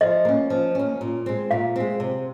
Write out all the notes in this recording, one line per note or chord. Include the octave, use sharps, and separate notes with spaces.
F3 D#5
A#3 C#4
F3
A#3 C#4
A#2
G#3 C4
A#2 F5
G#3 C4
C3